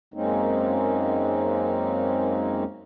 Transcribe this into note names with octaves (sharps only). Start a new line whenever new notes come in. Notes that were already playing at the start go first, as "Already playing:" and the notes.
F#2 G#3 A#3 C4 C#4 D#4